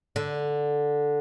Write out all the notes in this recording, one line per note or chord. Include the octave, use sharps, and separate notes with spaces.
D3